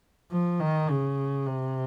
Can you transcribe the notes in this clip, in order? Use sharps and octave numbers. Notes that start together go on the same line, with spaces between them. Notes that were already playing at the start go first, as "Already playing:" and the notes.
F3
D#3
C#3
C3